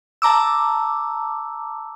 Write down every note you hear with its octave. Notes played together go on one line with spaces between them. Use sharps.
A5 A#5 D6 E6